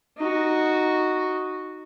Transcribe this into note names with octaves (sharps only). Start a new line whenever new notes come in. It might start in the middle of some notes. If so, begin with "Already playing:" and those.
D#4 F#4